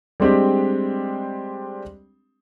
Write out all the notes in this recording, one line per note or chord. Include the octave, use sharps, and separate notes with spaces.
G3 G#3 C4 D4 G4